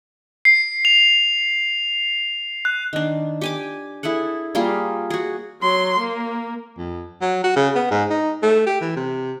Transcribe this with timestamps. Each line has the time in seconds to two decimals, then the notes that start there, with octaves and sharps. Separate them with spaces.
0.45 C7
0.85 F7
2.65 F#6
2.93 D#3 D4
3.41 G4 G#5 D6
4.03 E4 G#4 A4 F#5
4.55 G3 A#3 F4 G#4
5.10 F#4 G#4
5.62 F#3 C6
6.00 A#3
6.77 F2
7.21 F#3
7.44 F#4
7.56 C#3
7.75 B3
7.91 G#2
8.10 D#4
8.42 A3
8.67 G4
8.81 E3
8.96 C3